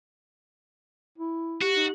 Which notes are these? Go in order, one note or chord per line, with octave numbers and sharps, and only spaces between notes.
E4
F#4 G4
D#4